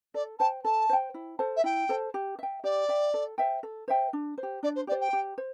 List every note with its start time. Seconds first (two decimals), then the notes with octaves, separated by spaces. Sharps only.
0.14 A4 D5
0.39 C5 G5 A5
0.64 A4 A5
0.89 C5 G5
1.14 E4
1.39 A4 C5 A5
1.56 E5
1.64 E4 G5
1.89 A4 C5 A5
2.14 G4
2.39 E5 G5
2.64 G4 D5
2.89 E5 G5
3.14 A4
3.38 C5 E5 G5
3.63 A4
3.88 C5 E5 G5
4.13 D4
4.38 C5
4.43 G4
4.63 D4 D5
4.75 C5
4.87 G4 D5
4.91 C5
5.01 G5
5.13 G4
5.38 C5